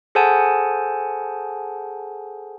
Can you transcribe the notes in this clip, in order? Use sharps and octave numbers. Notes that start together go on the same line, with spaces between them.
G#4 A4 C5 F#5 G#5 A5